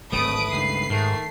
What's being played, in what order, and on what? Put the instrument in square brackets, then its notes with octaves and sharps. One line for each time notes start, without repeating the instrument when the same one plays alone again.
[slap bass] D1 G#1 [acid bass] A3 [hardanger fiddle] B4 [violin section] D#6 D7
[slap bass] C#2 G2 D#3 [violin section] C7
[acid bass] G#2 [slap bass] D#3 [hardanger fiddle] A3